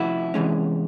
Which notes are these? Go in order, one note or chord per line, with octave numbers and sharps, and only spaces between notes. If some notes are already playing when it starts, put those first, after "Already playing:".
Already playing: C3 F3 A3 C#4 E4 F#4
C3 E3 G#3 C#4